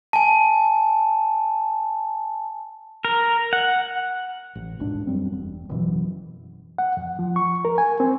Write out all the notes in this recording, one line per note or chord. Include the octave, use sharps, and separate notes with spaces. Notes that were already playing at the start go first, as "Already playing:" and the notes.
G#5 A5
A#4
F#5
A1
D#1 B1 G#2 D4
F#2 G3 C4
E1
F#1 B2 E3 F#3
F#5
F2
F3
C#6
A#4
G#5
C4